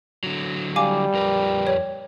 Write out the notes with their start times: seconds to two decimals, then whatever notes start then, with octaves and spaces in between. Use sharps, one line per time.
0.24 D3 F#3
0.76 G3 F5 G#5 D6
1.14 F2 A#4 B4
1.67 C#5